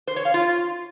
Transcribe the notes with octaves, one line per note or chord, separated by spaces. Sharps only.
C5
C#5
F5
F4